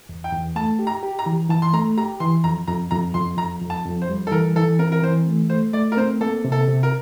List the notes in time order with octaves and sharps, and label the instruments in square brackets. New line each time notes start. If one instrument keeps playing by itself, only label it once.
[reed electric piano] E2
[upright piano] G5
[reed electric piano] E2
[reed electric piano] A3 [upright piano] A5
[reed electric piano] G4
[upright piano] A#5
[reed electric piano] G4
[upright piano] A#5
[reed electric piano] E3
[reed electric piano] E3 [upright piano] A5
[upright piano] C6
[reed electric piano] A3 [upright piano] A#5
[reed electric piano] G4 [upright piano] A#5
[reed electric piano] E3 [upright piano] C6
[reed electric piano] F2 [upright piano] A#5
[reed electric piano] F2 [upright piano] A#5
[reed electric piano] F2 [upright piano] A#5
[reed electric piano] F2 [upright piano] C6
[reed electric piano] F2 [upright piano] A#5
[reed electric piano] F2
[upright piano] A5
[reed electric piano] F2
[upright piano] C5
[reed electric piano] G3
[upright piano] A4
[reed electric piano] E3 [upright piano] A#4
[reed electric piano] E3 [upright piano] A4
[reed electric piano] C4 [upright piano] A#4
[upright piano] A#4
[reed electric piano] E3 [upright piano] C5
[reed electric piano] A3
[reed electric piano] A3 [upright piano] C5
[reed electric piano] A3 [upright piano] D5
[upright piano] A#4
[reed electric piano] C4 [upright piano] C5
[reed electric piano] A#3 [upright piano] A4
[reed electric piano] C3
[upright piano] A4
[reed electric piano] C3
[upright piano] A#4